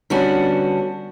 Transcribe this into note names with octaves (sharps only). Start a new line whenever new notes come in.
D3 G3 B3 C#4 D4 F#4